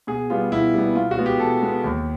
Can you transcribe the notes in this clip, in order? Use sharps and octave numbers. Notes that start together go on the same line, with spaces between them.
B2 G#4
G3 B3 F4
B2 E4
G3 B3
B2 F4
F#4
G#3 B3
G4
B2 A4
G#3 B3
D#2